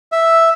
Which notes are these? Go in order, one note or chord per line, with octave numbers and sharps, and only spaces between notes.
E5